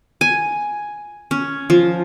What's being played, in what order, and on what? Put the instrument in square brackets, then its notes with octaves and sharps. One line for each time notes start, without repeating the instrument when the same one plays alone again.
[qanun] G#5
C#4
F3